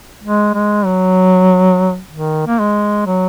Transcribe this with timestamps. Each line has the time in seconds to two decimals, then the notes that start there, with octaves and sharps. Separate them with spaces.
0.23 G#3
0.54 G#3
0.86 F#3
2.12 D#3
2.47 A#3
2.60 G#3
3.06 F#3